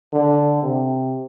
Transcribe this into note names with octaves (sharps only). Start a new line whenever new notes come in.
D3
C3